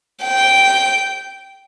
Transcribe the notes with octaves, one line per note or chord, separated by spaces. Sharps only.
G5